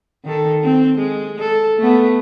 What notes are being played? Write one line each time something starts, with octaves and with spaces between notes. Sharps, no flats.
D#3 A4
C4
G#3
A4
A3 B3